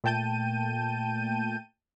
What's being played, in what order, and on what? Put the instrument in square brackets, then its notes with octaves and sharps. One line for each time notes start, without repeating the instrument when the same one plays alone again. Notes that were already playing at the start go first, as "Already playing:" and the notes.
[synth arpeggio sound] A#2 A3 G5 A5 G6 D#7